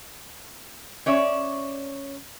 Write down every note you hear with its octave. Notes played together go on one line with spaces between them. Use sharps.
C#4 C#5 D5 E5